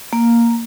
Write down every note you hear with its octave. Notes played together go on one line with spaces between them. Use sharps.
A#3